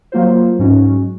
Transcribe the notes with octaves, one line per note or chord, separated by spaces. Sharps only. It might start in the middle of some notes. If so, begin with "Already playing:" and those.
F#3 A#3 F4 C5
G#2 F#3 C#4 F#4